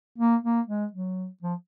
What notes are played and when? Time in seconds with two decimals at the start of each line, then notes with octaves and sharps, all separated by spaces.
0.18 A#3
0.43 A#3
0.68 G#3
0.93 F#3
1.43 F3